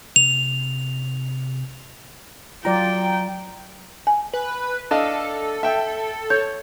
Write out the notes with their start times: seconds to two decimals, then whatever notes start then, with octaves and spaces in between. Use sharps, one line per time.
0.16 C3 F7
2.65 F#3 F4 D5 G5 A#5
4.07 G#5
4.33 B4
4.91 D4 A4 D#5 F5
5.63 E5 G5
6.30 C#5 G6